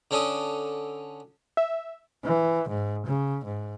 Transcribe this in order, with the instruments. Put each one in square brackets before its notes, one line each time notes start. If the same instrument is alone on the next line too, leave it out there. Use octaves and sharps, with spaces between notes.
[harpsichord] D3 C#4 A4 D#6
[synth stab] E5
[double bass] E3
G#2
C#3
G#2